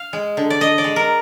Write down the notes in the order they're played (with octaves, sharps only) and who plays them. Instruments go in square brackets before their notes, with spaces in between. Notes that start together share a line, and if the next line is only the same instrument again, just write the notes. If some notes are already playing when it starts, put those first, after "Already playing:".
Already playing: [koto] F5
G#3
D3
D5
D3 D#5
D5
G#3
A#4